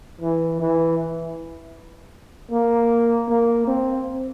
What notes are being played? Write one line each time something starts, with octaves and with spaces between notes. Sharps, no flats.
E3
E3
A#3
A#3
C4